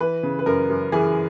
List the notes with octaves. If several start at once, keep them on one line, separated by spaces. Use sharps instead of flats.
E3 B4
C#3
B4
F#2 A#4
F#2
E3 G#4